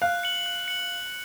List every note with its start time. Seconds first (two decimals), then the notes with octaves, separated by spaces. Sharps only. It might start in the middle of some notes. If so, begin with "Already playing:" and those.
0.02 F5 F#6
0.23 C#7 F#7
0.46 F#6
0.68 C#7 F#7